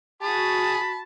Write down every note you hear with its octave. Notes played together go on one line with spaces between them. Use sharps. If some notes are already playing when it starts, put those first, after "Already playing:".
F#4 G#4 A5 B5